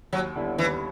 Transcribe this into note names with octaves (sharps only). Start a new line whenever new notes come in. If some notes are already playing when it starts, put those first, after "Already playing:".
D#2 F#3
D3 G3 B3 E4
D#2 E3